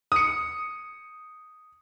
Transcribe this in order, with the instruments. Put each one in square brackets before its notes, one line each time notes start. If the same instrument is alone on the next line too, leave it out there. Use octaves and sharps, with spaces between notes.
[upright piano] D#6 C#7